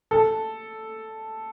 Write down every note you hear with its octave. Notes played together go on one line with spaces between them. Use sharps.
A4